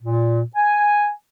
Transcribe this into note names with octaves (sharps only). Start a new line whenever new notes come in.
A#2
G#5